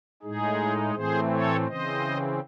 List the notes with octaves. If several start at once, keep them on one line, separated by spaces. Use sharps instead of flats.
A2 G#3 D#4 G#4
A2 E3 A3 C4 G#4 C5
A4 C#5
C#3 E3 C4 C5 D#5